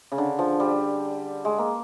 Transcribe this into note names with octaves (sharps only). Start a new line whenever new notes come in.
C#3
D3
F3
G3
G#3
A#3